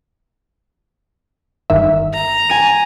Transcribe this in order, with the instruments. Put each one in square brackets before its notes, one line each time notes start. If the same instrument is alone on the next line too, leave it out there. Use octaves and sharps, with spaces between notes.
[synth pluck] G1 D#3 E5
[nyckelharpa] A#5
[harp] G#5 D#7